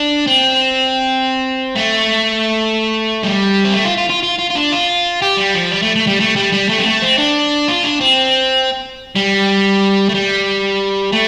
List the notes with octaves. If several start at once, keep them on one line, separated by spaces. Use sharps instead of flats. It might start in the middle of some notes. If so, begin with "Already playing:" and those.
Already playing: D4
C4
A3
G3
C4
A3
F4
F4
F4
F4
F4
F4
D4
F4
G4
G3
F3
G3
A3
A3
G3
A3
G3
G3
A3
C4
A3
C4
D4
F4
D4
C4
G3
A3
G3
A3